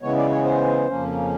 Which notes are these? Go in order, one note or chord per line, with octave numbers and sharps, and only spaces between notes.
C#3 E3 G#3 B3 C#5
D5
C#5
C5
F2 C#3 F3 A#3 C#4